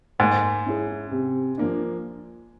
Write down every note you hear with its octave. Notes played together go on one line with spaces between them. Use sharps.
G#2 A#3
C#4 E4 G#4
C3
F3 A#3 D4